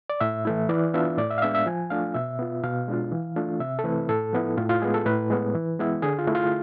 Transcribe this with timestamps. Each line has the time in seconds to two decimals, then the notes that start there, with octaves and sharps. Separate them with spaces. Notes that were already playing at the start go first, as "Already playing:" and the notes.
0.10 D5
0.21 A2 E5
0.45 E3 A3 E4
0.69 E3 D5
0.94 B3 D4 F4 E5
1.18 A2 D5
1.30 E5
1.38 F5
1.42 G#3 B3 D4 E5
1.55 E5
1.66 F3 G#5
1.90 A3 D4 F4 F5
2.14 B2 E5
2.39 B3 F4
2.63 B2 F5
2.88 G#3 D4 F4
3.12 E3
3.36 A3 D4 F4
3.60 C3 E5
3.79 A4
3.84 E3 A3 C4 E4 B4
4.09 A2 A4
4.33 F3 B3 E4
4.57 A2 F4
4.69 F4
4.82 G#3 B3 G#4
4.94 A4
5.06 A2 B4
5.30 G#3 B3
5.54 E3
5.79 G#3 B3 E4
6.02 D3 G#4
6.19 F4
6.27 A3 E4
6.35 F4